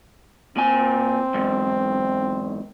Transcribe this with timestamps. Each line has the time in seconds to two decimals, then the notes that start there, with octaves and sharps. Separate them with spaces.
0.57 A#2 C4 G#5
1.34 E2 G#2